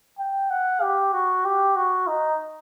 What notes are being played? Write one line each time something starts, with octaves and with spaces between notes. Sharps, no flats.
G5
F#5
G4
F#4
G4
F#4
D#4